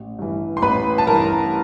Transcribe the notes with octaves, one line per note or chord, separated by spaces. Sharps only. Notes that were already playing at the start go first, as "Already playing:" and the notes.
Already playing: A1
G2 E3
C6
A1 B4 B5
A5
G2 E3 A#4 A#5